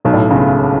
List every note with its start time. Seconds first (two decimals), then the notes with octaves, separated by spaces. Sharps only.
0.05 B1 B2
0.14 A2
0.30 C#2 C#3